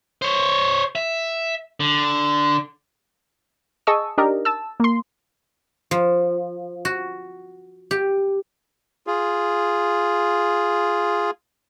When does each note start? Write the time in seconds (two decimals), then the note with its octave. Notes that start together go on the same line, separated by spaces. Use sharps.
0.22 C5 C#5
0.95 E5
1.80 D3
3.87 G#4 D#5 A5 C#6 D#6 E6
4.18 D4 D#4 G4 A#4 D5 D#5
4.45 A5 E6
4.80 A#3 C6
5.91 F3
6.85 F#4
7.91 G4
9.07 F4 G#4